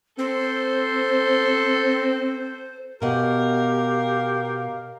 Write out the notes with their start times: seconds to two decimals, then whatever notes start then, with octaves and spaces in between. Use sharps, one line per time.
0.19 C4 A4 C5 C6
3.02 B2 G4 A#4 F5 F#5